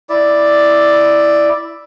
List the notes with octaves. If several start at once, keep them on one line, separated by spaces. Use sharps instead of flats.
E4 D5